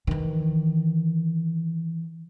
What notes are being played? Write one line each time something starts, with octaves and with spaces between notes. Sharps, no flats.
D#3 E3